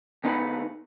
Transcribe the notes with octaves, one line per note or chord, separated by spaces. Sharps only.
D2 B3 D#4 B4 F#5 B5